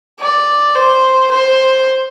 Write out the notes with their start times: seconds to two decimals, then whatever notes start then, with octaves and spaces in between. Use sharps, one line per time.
0.20 D5
0.75 C5
1.31 C5